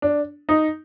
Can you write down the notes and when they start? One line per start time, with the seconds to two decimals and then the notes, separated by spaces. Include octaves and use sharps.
0.02 D4
0.49 D#4